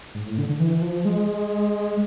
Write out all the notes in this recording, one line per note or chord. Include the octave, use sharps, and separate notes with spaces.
G#2
A2
D3
D3
E3
F3
G#3